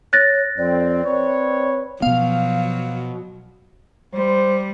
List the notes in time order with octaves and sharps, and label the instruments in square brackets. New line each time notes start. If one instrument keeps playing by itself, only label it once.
[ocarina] C#5 [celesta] F#6 A6 A#6
[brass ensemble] F2 C4 [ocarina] D5
[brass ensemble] C4 B4 C#5
[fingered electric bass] B2 B3 [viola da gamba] F3 F#3 [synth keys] F5
[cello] G3 [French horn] C5